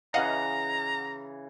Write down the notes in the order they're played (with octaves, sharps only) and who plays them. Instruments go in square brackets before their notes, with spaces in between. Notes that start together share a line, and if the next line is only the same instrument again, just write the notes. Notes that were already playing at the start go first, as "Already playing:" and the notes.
[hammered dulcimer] C#3 E3 [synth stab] D#5 F5 F#5 [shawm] A#5